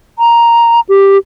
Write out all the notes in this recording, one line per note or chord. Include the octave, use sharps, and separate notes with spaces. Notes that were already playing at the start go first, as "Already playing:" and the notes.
A#5
G4